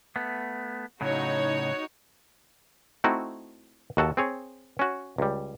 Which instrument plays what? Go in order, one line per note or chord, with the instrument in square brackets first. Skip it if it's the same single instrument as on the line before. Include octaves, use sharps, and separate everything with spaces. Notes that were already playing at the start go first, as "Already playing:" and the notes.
[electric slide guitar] A3 B3
[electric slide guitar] A2 C#3 F#3 [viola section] D#4 F#4 C#5
[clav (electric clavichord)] A3 C4 D#4 E4 F#4
D#2 F#4 A4 A5
C4 G#4 C#5
C#4 F#4
C#2 G3